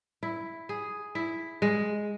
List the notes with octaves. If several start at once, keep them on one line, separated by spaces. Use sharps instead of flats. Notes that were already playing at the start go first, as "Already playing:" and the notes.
E4
G#4
E4
G#3